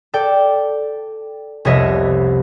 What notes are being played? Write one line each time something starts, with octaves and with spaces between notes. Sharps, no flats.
A4 D5 G5
F1 C2 B3 C#5 D#5 E5